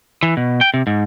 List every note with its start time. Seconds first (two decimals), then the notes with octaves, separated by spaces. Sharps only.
0.23 E3
0.37 B2
0.61 G5
0.74 C3
0.87 G#2